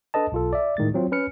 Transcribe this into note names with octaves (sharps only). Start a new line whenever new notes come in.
D4 A4 B4 D#5 A5
B1 F4 A4
D5 E5
A2 D#3 G#3 A6
F#3 C4 F4
C#4 B4 F6 C#7